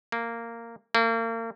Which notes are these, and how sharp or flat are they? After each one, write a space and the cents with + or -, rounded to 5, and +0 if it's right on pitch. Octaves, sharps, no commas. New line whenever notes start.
A#3 -15
A#3 -40